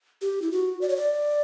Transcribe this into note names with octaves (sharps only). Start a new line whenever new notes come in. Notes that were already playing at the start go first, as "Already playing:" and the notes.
G4
E4
F#4
D5
C#5
D5